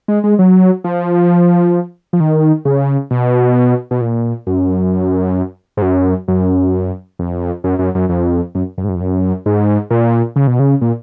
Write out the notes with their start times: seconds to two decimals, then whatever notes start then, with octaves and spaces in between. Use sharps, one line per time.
0.08 G#3
0.24 G#3
0.39 F#3
0.84 F3
2.13 F3
2.20 D#3
2.65 C#3
3.11 B2
3.91 B2
4.01 A#2
4.47 F#2
5.77 G#2
5.82 F#2
6.28 F#2
7.19 F2
7.64 F#2
7.79 F#2
7.95 F#2
8.09 F2
8.55 F#2
8.78 F#2
8.84 G#2
8.89 F#2
8.96 F2
9.01 F#2
9.46 G#2
9.91 A#2
10.36 C#3
10.47 B2
10.59 C#3
10.81 A#2